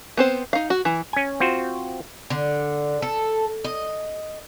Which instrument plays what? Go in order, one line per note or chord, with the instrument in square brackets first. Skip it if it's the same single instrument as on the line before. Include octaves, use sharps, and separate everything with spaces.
[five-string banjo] B3 C4 C5
D#4 F5
F#4
E3
[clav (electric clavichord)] C#4 G#5
C4 F4 F#4 C5
[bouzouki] D3
A4
D#5